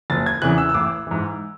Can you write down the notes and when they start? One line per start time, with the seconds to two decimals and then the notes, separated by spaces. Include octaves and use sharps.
0.10 F#1 A6
0.26 G#6
0.42 E2 C#3 E3 F#6
0.58 E6
0.69 E6
0.74 A1 D6
1.07 G#2 E3